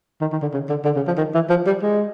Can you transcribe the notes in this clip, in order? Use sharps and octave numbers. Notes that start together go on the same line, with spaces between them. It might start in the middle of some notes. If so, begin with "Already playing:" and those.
D#3
D#3
D3
C#3
D3
D3
C#3
F3
D#3
E3
F3
G3
G#3